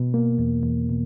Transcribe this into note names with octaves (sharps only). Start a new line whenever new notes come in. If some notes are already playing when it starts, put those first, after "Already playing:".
Already playing: B2
A#3
E2
E2
B2